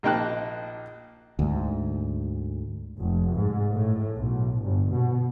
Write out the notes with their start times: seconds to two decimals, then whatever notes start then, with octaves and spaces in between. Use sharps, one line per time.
0.03 A#1 A#3 D#4 G5 A5 F#6
1.39 D2 G#2
3.00 F1
3.35 G#2
3.73 A2
4.18 B1
4.63 G1
4.92 B2